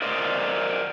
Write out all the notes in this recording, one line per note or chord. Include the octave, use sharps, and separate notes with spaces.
A#4 C5 D5 D#5